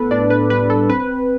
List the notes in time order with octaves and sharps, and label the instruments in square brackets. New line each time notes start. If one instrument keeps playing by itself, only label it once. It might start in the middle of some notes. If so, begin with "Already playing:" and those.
Already playing: [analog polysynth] A2 B3 A4 B4
A2 D4 D5
B4
G3 B4
A4
C4 B4